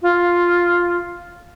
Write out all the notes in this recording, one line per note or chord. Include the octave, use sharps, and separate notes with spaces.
F4